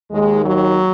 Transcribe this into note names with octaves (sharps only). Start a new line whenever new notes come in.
D#2 D#3 G#3
F#3